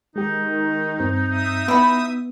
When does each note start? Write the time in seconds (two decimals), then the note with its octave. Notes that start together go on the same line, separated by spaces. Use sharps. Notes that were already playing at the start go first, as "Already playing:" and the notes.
0.16 D#3 G#3 D#4 G4
1.00 G2 C4
1.31 E5 D#6
1.68 B3 E4 B5